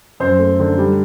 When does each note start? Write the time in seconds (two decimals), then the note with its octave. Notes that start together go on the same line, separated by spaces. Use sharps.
0.20 F#2 C5
0.39 A3
0.59 D3
0.78 G3